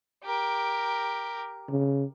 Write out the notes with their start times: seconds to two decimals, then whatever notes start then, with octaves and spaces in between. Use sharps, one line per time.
0.24 G4 A#4
1.70 C#3